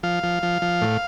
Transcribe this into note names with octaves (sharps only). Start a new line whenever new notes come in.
F3 F5
F3
F3
F3
A2